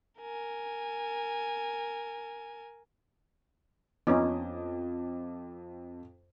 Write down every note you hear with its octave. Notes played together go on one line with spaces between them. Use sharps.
A#4 G#5
F2 B3 C#4 D#4 D#5 D6